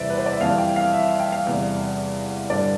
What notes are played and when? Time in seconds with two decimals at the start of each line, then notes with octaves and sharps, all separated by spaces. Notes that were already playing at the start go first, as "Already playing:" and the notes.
Already playing: E2 C3 E3 G3 C5 D5 E5
0.10 B4
0.18 C5
0.26 D5
0.33 E5
0.41 F2 E3 G3 F5
0.58 G5
0.76 F5
0.93 E5
1.20 G5
1.32 F5
1.46 E2 C3 G3
2.50 G2 D3 G3 D5